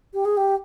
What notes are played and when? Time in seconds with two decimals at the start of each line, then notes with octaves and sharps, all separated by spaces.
0.14 G4
0.25 G#4
0.37 G4